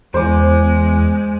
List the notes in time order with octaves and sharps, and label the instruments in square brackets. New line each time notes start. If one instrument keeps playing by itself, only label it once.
[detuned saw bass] E2 [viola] G#3 [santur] C5 D6